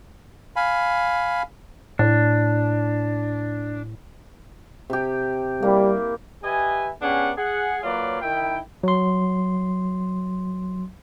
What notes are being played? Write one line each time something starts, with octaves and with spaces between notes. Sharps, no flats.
F5 G#5 B5
A2 D4
C3 G4
G3 A#3 E4
G4 B4 D#5 E5 G#5
B3 C#4 D4 G4 G#4 F#5
G#4 F#5
F#3 A#3 F4 B4 C#5 D5
D#3 E4 G5
F#3 C6